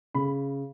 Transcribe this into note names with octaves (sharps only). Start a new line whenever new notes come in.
C#3 B5